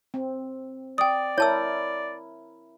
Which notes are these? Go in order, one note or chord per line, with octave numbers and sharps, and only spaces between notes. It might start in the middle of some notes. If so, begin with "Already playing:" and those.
C4
D5 G5 D#6
E4 A#4 C#5 A5 E6